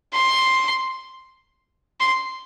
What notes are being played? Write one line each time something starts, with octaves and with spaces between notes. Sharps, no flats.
C6
C6